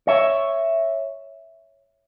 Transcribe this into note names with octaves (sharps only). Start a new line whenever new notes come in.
C#5 E5